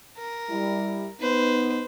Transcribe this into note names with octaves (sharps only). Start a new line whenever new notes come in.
A#4
G3 E4
B3 D#4 B4 C5